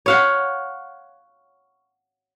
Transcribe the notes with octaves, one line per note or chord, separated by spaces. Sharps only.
C#5 F5 F#5